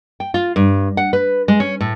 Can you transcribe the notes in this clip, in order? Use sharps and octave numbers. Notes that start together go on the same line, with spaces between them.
G5
F4
G2
F#5
B4
G#3
C#4
A2